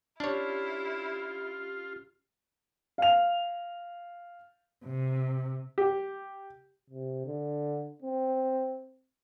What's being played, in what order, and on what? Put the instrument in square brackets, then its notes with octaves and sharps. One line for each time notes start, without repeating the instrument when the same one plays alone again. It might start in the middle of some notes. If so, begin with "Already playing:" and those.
[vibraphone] C#4 G4 [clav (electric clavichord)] D4 C#5 [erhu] E4 [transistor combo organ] F4
[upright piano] F5 F7
[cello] C3
[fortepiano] G4
[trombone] C3
D3
C4